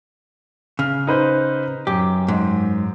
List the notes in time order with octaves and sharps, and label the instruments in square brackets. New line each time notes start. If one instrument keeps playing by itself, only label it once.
[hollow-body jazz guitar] C#3 [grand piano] F6
[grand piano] D#4 B4 C5
[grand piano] F#2 [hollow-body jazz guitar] G4
[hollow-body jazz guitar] G#2